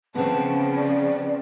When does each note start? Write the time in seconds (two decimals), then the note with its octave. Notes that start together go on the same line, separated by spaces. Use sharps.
0.15 C#3 F3 B3 C4 A5
0.76 D5